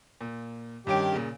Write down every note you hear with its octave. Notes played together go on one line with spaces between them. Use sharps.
A#2
G2 D#3 C#4 G4 D7
A#2 C#3